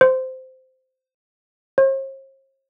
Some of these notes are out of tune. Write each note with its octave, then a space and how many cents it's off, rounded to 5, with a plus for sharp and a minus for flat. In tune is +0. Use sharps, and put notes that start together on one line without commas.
C5 -15
C5 +45